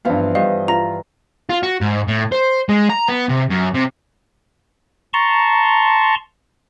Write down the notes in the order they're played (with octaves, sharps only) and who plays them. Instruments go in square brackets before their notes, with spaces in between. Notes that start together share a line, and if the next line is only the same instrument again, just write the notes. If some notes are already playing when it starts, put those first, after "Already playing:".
[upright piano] G2 F5 [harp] E3 F3 B3
[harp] G2 [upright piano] D#5 [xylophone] F5
[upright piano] F4 [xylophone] A#5 A#6
[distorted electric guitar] F4
F#4
G#2
A2
C5
G#3
A#5
B3
C3
F#2
C3
[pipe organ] A5 A#5 C6 C#6